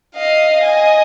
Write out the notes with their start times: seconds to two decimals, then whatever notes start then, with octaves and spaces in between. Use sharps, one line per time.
0.16 D#5 F5
0.63 D#5 G#5